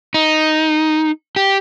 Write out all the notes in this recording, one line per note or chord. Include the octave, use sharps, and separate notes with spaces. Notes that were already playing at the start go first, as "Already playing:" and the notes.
D#4
G4